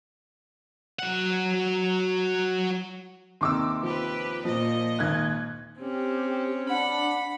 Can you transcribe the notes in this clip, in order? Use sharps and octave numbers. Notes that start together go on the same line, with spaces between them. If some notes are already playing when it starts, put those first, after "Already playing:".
F#3 F#5
D#2 C3 D#4 C6 D6 E6
F3 G4 B4
A#2 F3 D#5
G#1 D#2 F#6 G#6
C4 C#4 G4
D4 F#5 B5